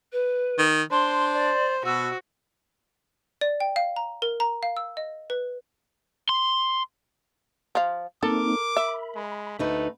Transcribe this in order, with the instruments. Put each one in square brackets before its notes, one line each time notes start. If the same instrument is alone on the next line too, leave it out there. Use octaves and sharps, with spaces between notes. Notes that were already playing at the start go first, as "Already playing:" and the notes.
[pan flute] B4
[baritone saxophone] D#3
[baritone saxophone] D4 [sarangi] C5 [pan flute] C6
[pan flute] D5
[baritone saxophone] B2 [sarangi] F#4 [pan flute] E6
[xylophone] D5
G5
F5
A#5
A#4
A#5
F5
E6
D#5
B4
[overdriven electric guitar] C6
[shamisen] F3 F5
[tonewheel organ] A#3 C4 D#4 [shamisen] A4 [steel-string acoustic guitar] A#4 [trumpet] D6
[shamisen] E5 [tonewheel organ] B5
[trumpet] G#3
[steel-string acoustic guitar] D2 D#4 B4 [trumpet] A3